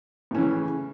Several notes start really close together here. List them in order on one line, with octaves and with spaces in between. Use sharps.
A2 C#4 E3 C#3